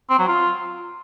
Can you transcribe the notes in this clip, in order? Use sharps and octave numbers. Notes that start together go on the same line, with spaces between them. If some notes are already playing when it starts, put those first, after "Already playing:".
C4
F#3
F4